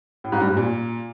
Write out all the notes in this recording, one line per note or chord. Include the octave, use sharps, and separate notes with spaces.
A2
G#2
G2
G3
A#2